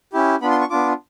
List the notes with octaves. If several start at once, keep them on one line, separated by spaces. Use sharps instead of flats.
C#4 E4 G4
B3 D4 F4 B5
C6
C#6
B3 D4 F4 D6